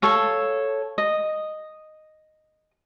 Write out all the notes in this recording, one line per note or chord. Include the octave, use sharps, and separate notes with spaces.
A4 C#5 F5
D#5